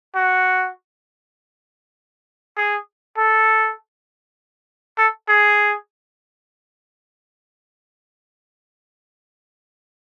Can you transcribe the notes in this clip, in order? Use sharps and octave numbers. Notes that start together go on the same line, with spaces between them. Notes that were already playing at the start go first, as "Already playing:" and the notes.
F#4
G#4
A4
A4
G#4